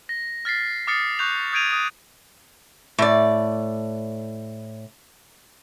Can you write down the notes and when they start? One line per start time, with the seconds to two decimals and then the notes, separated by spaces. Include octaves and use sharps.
0.09 A#6
0.45 F6 A6 B6 C7
0.87 D6 D#6 F6 A6 C7 C#7
1.19 C#6 F#6 G6 F7
1.53 D#6 G6 G#6 D7 D#7 F7
1.73 D#6
2.98 A2 D5